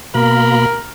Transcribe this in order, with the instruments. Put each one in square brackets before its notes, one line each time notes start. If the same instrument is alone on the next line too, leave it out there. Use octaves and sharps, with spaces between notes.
[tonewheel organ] B2 A#3 B5 [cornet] A#4